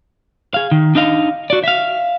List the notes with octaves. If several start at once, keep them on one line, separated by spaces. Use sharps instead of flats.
G#4 F5
D#3
D4 D#4 D#5 F5
F#4 D5
E5 F5